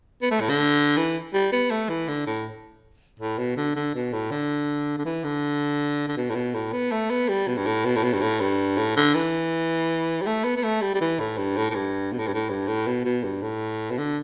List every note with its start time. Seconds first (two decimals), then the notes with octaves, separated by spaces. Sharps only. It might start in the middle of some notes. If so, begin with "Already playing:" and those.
0.22 B3
0.31 A3
0.40 A2
0.50 D3
0.97 E3
1.34 G3
1.52 B3
1.71 A3
1.89 E3
2.08 D3
2.27 A2
3.20 A2
3.38 B2
3.57 D3
3.76 D3
3.95 B2
4.13 A2
4.31 D3
4.98 D3
5.05 E3
5.24 D3
6.08 D3
6.17 B2
6.30 A2
6.35 B2
6.55 A2
6.73 B3
6.92 A3
7.10 B3
7.29 G3
7.47 B2
7.57 G2
7.66 A2
7.85 B2
7.97 A2
8.04 B2
8.13 G2
8.22 A2
8.40 G2
8.77 A2
8.97 D3
9.15 E3
10.22 G3
10.26 A3
10.44 B3
10.57 B3
10.64 A3
10.82 G3
10.94 G3
11.01 E3
11.20 A2
11.38 G2
11.57 A2
11.70 A2
11.75 G2
12.12 B2
12.19 A2
12.27 G2
12.34 A2
12.50 G2
12.68 A2
12.87 B2
13.05 B2
13.24 G2
13.42 A2
13.91 B2
13.98 D3